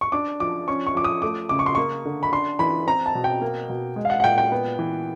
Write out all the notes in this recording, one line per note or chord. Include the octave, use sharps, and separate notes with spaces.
C#6
D4 D6
F3 D6
C#4 C#6
C#6
F3 D6
D#6
A3 D6
C#3 D6
C#6
C6
A#3 C#6
D3
B5
D4 C6
E3 B5
C4 A#5
A5
B2
G5
A#3
B2
G#3
F5
F#5
F#5
A#2 G5
G5
B3
E3